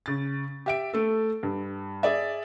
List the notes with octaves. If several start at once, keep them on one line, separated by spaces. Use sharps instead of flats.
C#3 A6
G4 E5 D7
A3 A4
G2
G#4 D5 E5